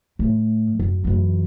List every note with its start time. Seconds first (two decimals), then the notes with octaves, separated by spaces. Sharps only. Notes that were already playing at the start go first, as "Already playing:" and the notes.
0.19 A2
0.79 F#2
1.05 F#2 E3